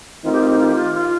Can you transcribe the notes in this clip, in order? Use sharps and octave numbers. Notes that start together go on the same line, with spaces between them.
D#3 A3 C4 D#4 F4
G4
F4
G4
F4
G4
F4
F4